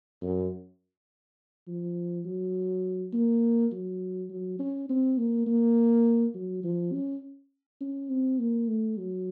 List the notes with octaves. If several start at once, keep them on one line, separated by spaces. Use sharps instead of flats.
F#2
F3
F#3
A#3
F#3
F#3
C#4
C4
A#3
A#3
F#3
F3
C#4
C#4
C4
A#3
A3
F#3